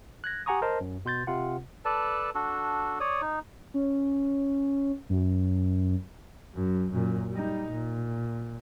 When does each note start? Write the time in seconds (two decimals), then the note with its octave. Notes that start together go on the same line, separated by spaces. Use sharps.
0.24 F#6 G#6 A#6
0.46 G4 F#5 G#5 A#5 C#6 D#6
0.62 A#4 C5 D#5 A5
0.81 F#2
1.05 B2 C6 G6 A6
1.27 C3 C4 F4 F#5
1.85 A4 B4 D5 A5
2.35 D4 F#4 A4
3.00 C#5 D5 D#6
3.21 D#4
3.74 C#4
5.09 F#2
6.55 F#2
6.91 F#2 A#2
7.31 G3 D#4
7.71 A#2